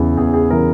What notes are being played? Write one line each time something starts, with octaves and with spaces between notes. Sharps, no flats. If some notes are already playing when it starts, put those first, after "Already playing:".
Already playing: E2 C#3 E3
E2 G#4
G#4
C#3 E3 A#4